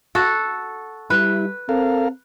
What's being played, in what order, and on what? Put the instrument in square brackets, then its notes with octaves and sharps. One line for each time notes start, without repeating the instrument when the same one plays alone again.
[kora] F#4 A4
[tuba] G3 [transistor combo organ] E4 [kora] B4
[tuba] C4 [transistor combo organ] A4 A#4 F5